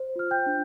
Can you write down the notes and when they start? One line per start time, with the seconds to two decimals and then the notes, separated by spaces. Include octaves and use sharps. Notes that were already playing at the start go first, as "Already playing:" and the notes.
Already playing: C5
0.16 F4 F6
0.31 G5 G6
0.46 D4